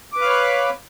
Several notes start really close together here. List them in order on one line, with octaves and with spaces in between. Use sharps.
D6 B4 F5 C#5 B5